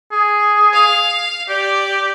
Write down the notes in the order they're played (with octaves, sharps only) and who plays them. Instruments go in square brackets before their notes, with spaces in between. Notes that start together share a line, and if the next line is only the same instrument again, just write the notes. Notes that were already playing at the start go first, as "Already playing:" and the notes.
[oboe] G#4
[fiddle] F5
[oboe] G4 [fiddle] D5